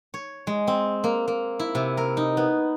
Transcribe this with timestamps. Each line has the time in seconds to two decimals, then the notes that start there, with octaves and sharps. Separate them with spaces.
0.14 C#5
0.47 G#3
0.67 C4
1.04 A#3
1.28 A#3
1.59 E4
1.75 C3
1.97 A#4
2.17 D#4
2.37 B3